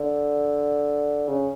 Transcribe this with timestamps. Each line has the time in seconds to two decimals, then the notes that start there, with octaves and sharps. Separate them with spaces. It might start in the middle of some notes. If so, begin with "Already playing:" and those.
Already playing: D3
1.28 C#3